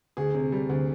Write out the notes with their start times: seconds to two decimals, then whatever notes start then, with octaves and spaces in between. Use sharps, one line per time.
0.17 D2 G#4
0.35 C3
0.52 G3
0.69 D2